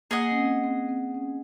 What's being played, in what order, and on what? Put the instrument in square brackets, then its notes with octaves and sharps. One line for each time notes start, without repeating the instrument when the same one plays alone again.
[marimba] A#3 [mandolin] G#4 D#5 F#5
[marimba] C#4
C4
C4
C4
C#4